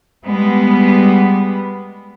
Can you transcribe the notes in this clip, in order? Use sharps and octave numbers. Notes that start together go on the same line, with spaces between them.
G3 G#3 B3